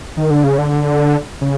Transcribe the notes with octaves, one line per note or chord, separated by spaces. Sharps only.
D#3
D3
C#3
D3
C#3